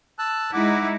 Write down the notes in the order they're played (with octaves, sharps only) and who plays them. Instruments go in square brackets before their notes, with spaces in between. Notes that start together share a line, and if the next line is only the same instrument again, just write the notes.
[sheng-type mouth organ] A5 E6 F#6
[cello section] G#3 D#4 E4 [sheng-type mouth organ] F#5 D6